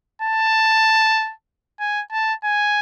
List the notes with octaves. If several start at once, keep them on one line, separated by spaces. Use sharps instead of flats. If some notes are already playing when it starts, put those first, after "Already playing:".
A5
G#5
A5
G#5